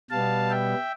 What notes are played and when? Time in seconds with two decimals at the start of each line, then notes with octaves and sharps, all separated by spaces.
0.10 B2 G3 B3 F5 A5
0.50 E5 G5